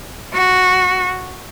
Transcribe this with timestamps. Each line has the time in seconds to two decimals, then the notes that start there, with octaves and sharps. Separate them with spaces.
0.33 F#4